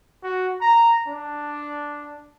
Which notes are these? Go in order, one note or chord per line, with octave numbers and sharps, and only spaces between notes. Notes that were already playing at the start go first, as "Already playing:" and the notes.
F#4
A#5
D4